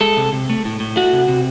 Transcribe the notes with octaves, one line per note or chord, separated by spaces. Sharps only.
G#3 A4
C3
C3
A3
A2
A2
A3 F#4
C3
C3